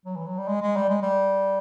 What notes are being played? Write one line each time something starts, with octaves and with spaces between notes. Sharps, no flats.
F#3
E3
F#3
G3
G#3
G#3
G3
G#3
G3